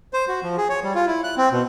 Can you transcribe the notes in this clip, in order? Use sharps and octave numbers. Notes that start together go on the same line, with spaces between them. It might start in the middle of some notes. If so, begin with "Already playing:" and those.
C5
F#4
F3
G#4
C#5
G3
F4
E4
F#6
C4
B2